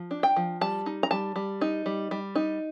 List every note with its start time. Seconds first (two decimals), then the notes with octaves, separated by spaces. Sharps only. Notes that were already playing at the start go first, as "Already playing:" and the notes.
Already playing: F3
0.11 D4
0.23 G5
0.36 F3
0.61 G3 A5
0.86 D#4
1.03 A#5
1.11 G3 A5
1.36 G3
1.61 D#4
1.86 G3
2.11 G3
2.35 D#4